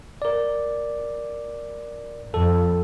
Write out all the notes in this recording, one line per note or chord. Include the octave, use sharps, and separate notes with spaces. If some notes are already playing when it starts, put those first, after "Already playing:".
A#4 D5
F2 A4